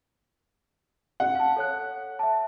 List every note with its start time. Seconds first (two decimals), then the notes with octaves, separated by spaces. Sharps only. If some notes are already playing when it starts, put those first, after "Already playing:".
1.20 F#5
1.35 F5 A5
1.56 A4 C#5 F#6
2.19 E5 A5